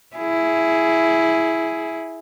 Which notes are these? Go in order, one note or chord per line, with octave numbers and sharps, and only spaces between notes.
E4 G#4